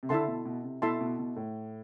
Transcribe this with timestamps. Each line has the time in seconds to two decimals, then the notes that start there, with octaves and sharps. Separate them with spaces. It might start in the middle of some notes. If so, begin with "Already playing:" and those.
0.03 C3
0.09 D3 E4 A4 E5 A5 C6
0.28 B2
0.45 B2
0.63 C3
0.82 B2 E4 A4 E5 A5 C6
1.01 B2
1.19 B2
1.36 A2